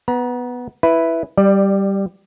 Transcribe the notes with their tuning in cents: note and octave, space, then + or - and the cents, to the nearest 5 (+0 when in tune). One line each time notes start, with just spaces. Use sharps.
B3 +0 A#5 +40
E4 +0 B4 +0
G3 +0 D5 +25